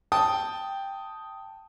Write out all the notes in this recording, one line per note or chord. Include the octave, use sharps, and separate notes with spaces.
G5 A5 D#6